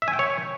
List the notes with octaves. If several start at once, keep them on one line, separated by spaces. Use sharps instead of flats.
E5
G#5
G5
C#5